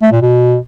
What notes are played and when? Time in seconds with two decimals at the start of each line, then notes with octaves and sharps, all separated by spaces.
0.02 A3
0.12 A#2
0.22 B2